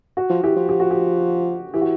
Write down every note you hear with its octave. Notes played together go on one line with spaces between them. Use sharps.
F#4
F3
E3 G4
F3
G4
F#4
G4
E3 G4
F#4